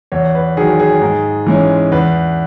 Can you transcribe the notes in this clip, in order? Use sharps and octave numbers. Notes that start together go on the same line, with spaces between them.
E2 C#5
B4
D#3 F#3 G#4
G#4
G#2
E3 G#3 C#4
E2 B4